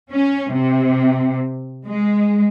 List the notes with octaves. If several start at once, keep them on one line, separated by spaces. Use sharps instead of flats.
C#4
C3
G#3